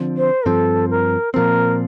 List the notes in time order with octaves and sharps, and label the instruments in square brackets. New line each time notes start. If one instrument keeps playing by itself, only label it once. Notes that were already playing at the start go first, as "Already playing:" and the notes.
Already playing: [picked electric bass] D3 F3 C4
[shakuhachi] C5
[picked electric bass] G2 F3 C4 [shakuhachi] A4
[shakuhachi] A#4
[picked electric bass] A#2 F3 C4 [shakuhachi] A#4